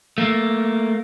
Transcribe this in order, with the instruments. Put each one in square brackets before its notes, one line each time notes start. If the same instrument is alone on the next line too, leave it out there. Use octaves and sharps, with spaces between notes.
[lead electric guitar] A3 A#3